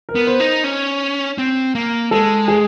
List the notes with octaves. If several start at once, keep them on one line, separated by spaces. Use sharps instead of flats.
A#4
B3
C5
D#4
C#4
C4
A#3
G#3 A4
G#4